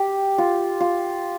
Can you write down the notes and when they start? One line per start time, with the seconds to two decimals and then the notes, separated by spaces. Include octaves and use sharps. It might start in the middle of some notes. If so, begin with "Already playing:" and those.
Already playing: G4
0.38 F4
0.80 F4